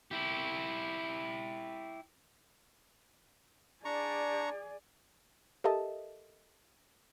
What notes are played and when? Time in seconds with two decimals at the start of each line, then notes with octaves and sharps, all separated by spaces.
0.11 E4 G4
3.85 D4 G#4 D5 A#5 C#6
5.64 G4 A4 A#4 D#5 E5 A5